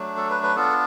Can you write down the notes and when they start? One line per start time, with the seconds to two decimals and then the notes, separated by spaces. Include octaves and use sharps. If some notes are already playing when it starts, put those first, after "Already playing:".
Already playing: F#3 A3 D4
0.17 A4
0.30 B4
0.43 B4
0.56 B3 D4 F4 A4